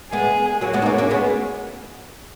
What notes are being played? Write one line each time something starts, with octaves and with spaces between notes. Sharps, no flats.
G#3 B3 G#4
F#3 A#3 F#4
G#3 B3
D#4
A#3 C#4
A#3 C#4
G#3 B3